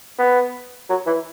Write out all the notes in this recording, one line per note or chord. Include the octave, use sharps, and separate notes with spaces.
B3
F#3
E3